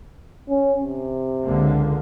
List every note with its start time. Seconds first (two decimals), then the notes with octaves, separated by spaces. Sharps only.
0.49 C#4
0.81 C3
1.45 C#2 D3 A#3